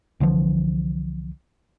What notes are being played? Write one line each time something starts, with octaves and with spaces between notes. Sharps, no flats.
C2 D3 E3 F3